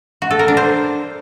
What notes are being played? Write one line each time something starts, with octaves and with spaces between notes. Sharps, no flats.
F#4
A4
A#4
D4
C5